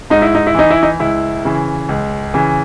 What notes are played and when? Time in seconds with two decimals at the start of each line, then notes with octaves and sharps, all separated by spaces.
0.10 G#2 D#4
0.22 E4
0.35 D#4
0.47 E4
0.55 E3 D#4
0.70 E4
0.83 D#4
0.99 C#2 E4
1.45 C#3 E3
1.89 C#2
2.34 C#3 E3